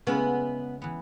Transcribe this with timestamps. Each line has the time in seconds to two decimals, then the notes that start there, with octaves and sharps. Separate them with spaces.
0.07 C#3 G#3 B3 C#4 E4
0.82 E3 B3